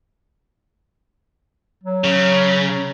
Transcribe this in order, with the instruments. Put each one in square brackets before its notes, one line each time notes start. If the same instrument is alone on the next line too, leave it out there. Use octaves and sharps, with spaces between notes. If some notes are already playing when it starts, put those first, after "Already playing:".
[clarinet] F#3
[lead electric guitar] C#3